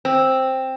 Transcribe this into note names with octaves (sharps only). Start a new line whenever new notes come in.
C4